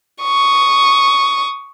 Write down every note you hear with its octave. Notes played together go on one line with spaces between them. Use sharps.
C#6 D#6